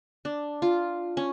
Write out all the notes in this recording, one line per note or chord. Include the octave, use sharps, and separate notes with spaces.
D4
F4
C#4